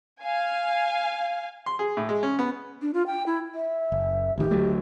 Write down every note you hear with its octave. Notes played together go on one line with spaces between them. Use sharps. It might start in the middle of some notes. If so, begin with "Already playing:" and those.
F5 G#5
C6
G#4
A2
G#3
C#4
B3
D4
F4
G5
E4
E5
F#1
A1 D#3 G4
D2 F#3 A3